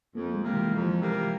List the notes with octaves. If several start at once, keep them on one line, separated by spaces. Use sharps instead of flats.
F2 A#3
G#3
C3 G3 A#3
E3
F2 F3
C3 G3 A#3